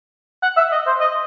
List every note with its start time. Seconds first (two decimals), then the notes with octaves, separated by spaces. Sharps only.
0.42 F#5
0.57 E5
0.72 D#5
0.87 C5
1.00 D#5